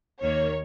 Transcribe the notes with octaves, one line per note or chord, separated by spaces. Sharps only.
D#2 D#3 A#3 C#5